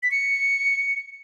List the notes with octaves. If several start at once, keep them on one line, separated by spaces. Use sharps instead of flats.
B6
C#7